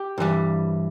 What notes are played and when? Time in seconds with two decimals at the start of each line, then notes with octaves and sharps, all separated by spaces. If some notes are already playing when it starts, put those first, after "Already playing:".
Already playing: G4
0.18 G2 E3 G3